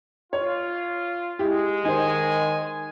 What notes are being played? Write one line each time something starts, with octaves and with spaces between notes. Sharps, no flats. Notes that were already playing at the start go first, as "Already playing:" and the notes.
F4 C#5
G#3 E4 G4
D#3 D#4 C5 G#5